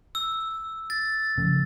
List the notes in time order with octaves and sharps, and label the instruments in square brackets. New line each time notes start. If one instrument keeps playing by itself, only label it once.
[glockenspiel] E6
A6
[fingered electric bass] C#3 F3 F#3